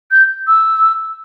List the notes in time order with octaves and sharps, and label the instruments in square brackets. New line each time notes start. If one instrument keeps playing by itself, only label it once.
[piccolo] G6
E6